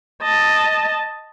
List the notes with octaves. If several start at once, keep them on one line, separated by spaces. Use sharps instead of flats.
D#5 A5